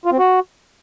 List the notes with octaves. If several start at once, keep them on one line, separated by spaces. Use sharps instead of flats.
F4
C4
F#4